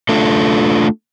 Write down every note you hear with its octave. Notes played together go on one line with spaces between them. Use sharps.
A3 D4 F4 A4